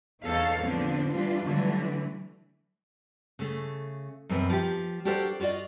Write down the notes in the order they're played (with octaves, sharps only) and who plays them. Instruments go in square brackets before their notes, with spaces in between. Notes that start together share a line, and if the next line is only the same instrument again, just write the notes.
[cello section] E2 D#4 A4 C#5 F5
A2 D3 F3 B3 C4 D4
E3 G3 D4 F4
D3 E3 F#3 G3 A3
[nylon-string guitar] C#3 A3
F#2 B2 E3 C4 B4
F3 G4
D4 F#4 G4 A4 A#4 C5
F4 F#4 C5 D5 D#5